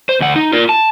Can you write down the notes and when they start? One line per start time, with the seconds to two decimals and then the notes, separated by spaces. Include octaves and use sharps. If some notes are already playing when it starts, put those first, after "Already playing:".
0.09 C5
0.20 D2 F#5
0.36 D#4
0.53 F4 A#4
0.69 A5